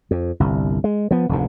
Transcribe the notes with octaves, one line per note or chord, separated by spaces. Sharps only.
F2
G1 C2
G#3
F3 B3
F1 D2 G#2